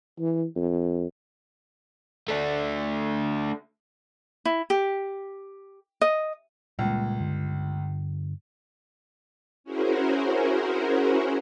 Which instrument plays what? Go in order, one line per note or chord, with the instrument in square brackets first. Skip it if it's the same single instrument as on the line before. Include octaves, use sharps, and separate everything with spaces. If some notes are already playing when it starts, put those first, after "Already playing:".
[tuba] E3
F2
[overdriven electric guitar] A3 D4
[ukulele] E4
G4
D#5
[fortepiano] C#2 [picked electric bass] A#2 G3 A#3
[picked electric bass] G2 D3
[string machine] C#4 E4 F#4 G#4 A#4 C5